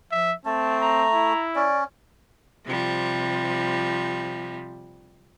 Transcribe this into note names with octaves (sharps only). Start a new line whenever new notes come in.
F3 E5
A3 C4 A5
A#5
E4
C#4 D5
C3 F3 G3